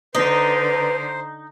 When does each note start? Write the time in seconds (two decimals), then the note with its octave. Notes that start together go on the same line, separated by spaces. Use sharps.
0.15 D3 D#4 B4 C5